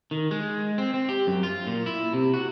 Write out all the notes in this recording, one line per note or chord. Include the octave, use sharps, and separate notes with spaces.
D#3
G#3
C4
C4
G4
F#2
F4
A#2
E4
C3
F#4